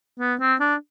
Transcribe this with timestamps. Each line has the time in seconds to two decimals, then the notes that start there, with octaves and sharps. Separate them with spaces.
0.20 B3
0.40 C4
0.60 D4